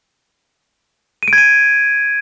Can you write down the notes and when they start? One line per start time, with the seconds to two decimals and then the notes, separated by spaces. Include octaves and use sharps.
1.23 D#7
1.28 D7
1.33 G#6
1.38 D#7